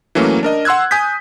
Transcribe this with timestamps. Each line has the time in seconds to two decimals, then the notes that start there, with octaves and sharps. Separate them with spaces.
0.15 E3 F#3 A3 A#3 C#4
0.43 D4 A#4 D#5
0.65 F#5 C6 E6 F#6 G#6
0.91 G#5 D#6 G6 B6